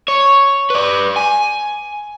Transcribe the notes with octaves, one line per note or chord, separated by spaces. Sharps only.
C#5
B4 D5
G#5